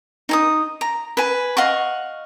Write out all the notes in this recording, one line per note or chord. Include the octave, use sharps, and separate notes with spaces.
D#4 G#5 D#6
A#5
B4 G#5
D#5 F5 F#5 C#6